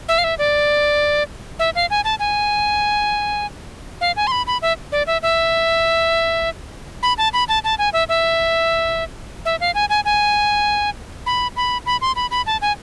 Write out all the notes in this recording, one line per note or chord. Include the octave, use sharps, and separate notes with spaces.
E5
F5
E5
D5
E5
F5
G#5
A5
G#5
F5
G#5
C6
B5
B5
E5
D5
E5
E5
B5
A5
B5
A5
A5
G#5
E5
E5
E5
F5
G#5
G#5
G#5
B5
B5
B5
C6
B5
B5
A5
G#5